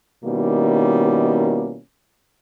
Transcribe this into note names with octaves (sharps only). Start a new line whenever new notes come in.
B2 D#3 G3 A#3 C#4 E4